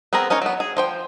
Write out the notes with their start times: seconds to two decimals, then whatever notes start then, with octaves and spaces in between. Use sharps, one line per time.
0.13 B3 C4 G#4 A#4 A#5
0.30 C#4 D#4 A#4 C#5
0.42 F#3 B3
0.60 G#4
0.77 F3 C5 G5